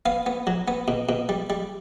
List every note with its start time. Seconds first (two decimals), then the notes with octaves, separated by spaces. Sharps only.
0.06 B3 F5
0.26 B3
0.47 F#3
0.68 B3
0.88 B2
1.09 B2
1.29 G3
1.50 G3